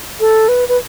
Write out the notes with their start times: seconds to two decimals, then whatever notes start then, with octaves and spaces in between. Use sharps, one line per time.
0.20 A4
0.48 B4
0.69 B4